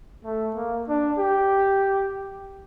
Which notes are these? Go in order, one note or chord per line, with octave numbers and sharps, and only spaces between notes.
A3
A#3
D4
G4